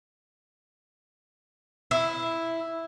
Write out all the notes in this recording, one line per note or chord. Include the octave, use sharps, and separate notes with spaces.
E4